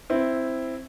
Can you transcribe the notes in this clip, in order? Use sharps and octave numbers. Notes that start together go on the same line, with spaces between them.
C4 E4